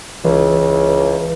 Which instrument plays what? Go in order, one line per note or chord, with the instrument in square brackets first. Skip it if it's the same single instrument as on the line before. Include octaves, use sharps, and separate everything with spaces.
[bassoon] C#2 [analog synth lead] E3